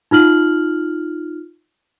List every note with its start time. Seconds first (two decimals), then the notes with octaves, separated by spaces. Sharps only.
0.11 D#4 F4 F6 F#7